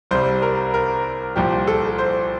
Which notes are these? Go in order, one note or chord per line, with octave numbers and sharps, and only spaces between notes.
C2 C3 G3 C5
A#4
A#4
C2 A#2 F3 G4
A4
C5